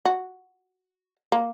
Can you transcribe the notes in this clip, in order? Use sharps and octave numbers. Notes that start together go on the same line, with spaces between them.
F#4
A#3